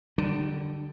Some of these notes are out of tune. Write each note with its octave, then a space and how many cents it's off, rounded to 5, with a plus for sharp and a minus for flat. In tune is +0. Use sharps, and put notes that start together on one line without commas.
D3 +0 G3 -25 D4 +40